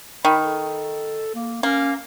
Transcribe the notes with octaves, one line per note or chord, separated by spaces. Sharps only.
D#3 B5
A4
A#3
A#3 C#4